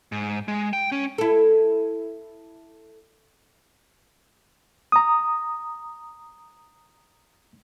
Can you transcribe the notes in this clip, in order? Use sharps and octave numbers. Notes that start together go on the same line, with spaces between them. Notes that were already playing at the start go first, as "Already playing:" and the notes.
G#2
G#3
G5
C#4
E4 A4
A#5 D#6